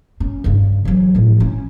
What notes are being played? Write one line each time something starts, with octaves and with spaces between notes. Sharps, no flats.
C#4
G2 C#3
E3 F#3
A2 F3
C#4 E4